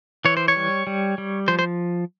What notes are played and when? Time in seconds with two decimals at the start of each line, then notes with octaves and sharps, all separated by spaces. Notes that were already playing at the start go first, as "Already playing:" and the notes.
0.25 E3 C#5
0.37 C5
0.48 C#5
0.56 G3
0.87 G3
1.18 G3
1.48 F3 C5
1.59 C5